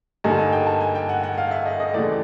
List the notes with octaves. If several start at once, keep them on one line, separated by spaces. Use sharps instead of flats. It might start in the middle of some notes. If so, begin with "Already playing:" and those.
G2 D3 G3 A#3 D#4 G#5
A5
G#5
G5
A5
G#5
G5
F#5
F#5
F5
E5
D#5
D#5
D#2 C#3 E3 A3 D5